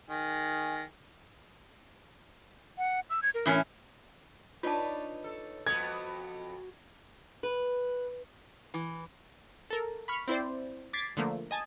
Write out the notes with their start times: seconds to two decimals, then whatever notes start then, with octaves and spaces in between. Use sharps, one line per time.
0.10 D#3 G#4
2.78 F#5
3.10 E6
3.23 G#6
3.35 A#4
3.46 A2 E3 C#4
4.63 D4 D#4 F4 B4 C#5 A5
5.24 A4
5.67 F2 B3 F#4 G#6
7.43 B4
8.74 E3
9.70 A4 A#4
10.08 B5 C#6 F6
10.28 C4 E4 C5 D5
10.93 D6 G#6 A6 B6 C7
11.17 D3 F3 A3 A#3
11.51 D#5 G#5 A5